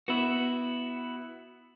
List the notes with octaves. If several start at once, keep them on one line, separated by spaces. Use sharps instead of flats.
B3 E4 F#4